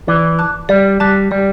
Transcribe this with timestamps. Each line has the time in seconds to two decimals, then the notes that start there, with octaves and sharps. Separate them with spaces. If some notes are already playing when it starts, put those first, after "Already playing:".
0.08 E3 D5
0.39 A5 D6 F#6
0.69 G3 D5
1.00 G3 A5 D6 F#6
1.31 G3 D5